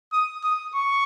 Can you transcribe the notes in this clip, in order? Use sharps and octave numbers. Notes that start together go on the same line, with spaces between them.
D#6
D#6
C#6